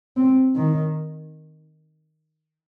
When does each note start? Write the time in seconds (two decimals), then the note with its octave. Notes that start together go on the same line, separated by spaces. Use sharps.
0.17 C4
0.55 D#3